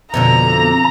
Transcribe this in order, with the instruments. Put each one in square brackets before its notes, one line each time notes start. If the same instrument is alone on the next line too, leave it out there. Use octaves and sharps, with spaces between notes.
[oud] F2 B2 D3 [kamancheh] A#5